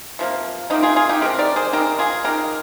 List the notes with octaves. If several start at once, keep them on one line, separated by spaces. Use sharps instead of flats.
C3 F3 A#3
C3 F3 A#3 D#4 G4
F4 G#4
F4 G#4
D#4 G4
C3 D#3 G#3 G4 A#4
A#4 D5
G#4 C5
D#3 G#3 G4 A#4
F4 G#4
D#3 G#3 G4 A#4